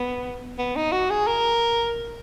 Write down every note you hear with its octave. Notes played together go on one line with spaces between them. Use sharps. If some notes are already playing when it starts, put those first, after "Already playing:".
Already playing: B3
B3
D#4
F#4
G#4
A#4